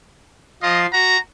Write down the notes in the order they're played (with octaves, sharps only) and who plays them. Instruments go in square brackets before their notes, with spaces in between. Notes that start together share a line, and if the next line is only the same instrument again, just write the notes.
[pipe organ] F3 F4 C6 [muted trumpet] D#5
[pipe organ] F#4 [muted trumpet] A#5